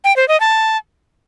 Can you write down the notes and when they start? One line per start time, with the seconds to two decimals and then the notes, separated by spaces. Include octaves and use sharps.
0.04 G5
0.16 C5
0.28 D#5
0.40 A5